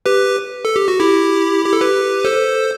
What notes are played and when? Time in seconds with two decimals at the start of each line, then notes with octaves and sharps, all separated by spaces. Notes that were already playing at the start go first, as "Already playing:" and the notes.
0.06 G4 B4
0.65 A4
0.76 G4
0.88 F#4
0.99 E4 G4
1.66 G4
1.73 A4
1.81 G4 B4
2.25 A4 C5